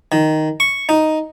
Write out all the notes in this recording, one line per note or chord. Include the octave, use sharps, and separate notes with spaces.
D#3
C#6
D#4